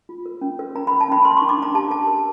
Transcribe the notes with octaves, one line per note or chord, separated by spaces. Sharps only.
F4
A#4
C#4
A#4
C#4 A#5
A#4 B5
A5
C#4 B5
A#4 C6
D4 C#6
D6
D4 A#5
G4 A5
A#4 A5
A#4